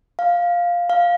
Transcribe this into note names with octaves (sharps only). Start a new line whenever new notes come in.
F5
F5